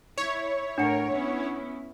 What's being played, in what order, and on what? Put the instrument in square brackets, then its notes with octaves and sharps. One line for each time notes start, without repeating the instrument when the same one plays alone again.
[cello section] E4 [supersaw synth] C#5
[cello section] A2 A#4 [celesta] D4 F#5 C#7
[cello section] B3 C#4 E4